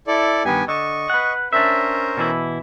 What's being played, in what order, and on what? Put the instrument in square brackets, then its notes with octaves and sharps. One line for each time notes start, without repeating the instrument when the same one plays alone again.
[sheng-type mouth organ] E4 A4 D5
[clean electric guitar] G2 D#3 [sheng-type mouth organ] B3 G4 G#5
[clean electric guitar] D3 [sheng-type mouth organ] D#5 C#6
[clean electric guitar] B4 F#5
[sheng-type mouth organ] C#4 A#4 C5 [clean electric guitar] D4 E5
[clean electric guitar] B2 E3 E4